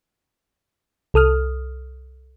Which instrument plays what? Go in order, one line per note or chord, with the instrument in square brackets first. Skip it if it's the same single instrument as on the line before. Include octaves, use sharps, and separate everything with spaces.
[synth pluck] C2 A4 D#6 F6